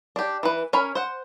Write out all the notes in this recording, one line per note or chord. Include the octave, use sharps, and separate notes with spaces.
D4 G4
E3 B4
C#4 A#4 G#5 B5
C5 F#5